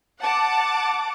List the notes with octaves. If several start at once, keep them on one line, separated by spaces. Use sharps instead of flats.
F#5 A5 D6